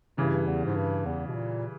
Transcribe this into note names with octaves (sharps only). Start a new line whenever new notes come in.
G2 C#3 E3 G3
E2
G#2
G2
E2
B2
A#2